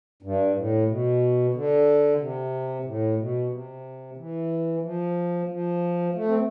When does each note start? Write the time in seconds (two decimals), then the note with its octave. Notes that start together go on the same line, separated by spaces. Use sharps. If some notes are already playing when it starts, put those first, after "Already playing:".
0.22 G2
0.55 A2
0.87 B2
1.54 D3
2.19 C3
2.85 A2
3.18 B2
3.51 C3
4.17 E3
4.83 F3
5.49 F3
6.14 A3
6.28 C4